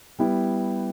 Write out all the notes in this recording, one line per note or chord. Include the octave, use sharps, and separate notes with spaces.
G3 B3 E4 G4